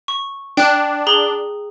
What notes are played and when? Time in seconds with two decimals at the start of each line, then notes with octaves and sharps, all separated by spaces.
0.08 C#6
0.57 D4 G5 F#6
1.07 G#4 A#5 G7